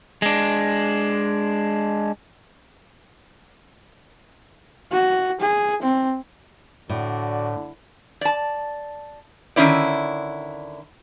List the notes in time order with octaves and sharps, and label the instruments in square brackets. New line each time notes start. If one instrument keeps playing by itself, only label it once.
[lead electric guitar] G#3 D4
[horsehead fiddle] F#4
G#4
C4
[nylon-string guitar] A2 [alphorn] D3 [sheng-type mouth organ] F#4 D5
[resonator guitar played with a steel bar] D5 A5
D3 D#3 C#4 E4 D5